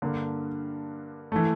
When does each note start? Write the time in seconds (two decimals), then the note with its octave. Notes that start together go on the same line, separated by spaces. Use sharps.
0.02 G2 D3 A#3
1.32 E3 A3